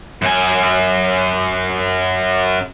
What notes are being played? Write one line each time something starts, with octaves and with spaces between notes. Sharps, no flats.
F#2 G#5